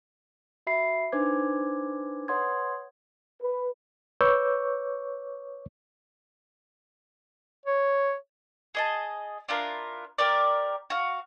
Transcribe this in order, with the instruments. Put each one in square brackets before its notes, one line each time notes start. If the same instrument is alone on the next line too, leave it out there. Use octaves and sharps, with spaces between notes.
[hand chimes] F#4 E5 B5 C7
D4 D#4 B4 C5 D6 G#6
B4 C#5 F#5 C6 D#6 G#6
[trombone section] B4
[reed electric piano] B4 C#5 C#6 D6 E6 G6
[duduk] C#5
[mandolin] G#4 D#5 A5
D4 E4 F4 A#4
G4 A#4 D5
F#4 F5